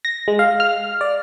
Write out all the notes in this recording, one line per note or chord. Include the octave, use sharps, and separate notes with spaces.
A#6
G#3
F5
F6
D5